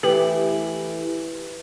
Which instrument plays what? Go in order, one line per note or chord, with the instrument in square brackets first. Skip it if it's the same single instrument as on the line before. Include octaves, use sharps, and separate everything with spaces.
[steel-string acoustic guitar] E3 A3 E4 [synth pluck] G4 [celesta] B4 F#7